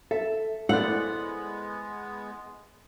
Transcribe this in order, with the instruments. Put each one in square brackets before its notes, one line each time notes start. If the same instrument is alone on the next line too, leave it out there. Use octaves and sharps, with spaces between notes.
[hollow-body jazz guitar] A4 [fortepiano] E5
[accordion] G#3 B3 [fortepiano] A3 D5 [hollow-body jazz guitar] E4 C5 [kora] F#5